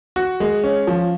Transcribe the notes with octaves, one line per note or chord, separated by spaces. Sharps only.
F#4
G#3
C#4
F3